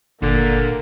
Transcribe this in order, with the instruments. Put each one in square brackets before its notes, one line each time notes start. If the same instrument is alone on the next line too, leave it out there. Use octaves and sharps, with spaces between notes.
[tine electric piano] G1 [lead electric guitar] A#2 [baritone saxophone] D3 [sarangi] A#3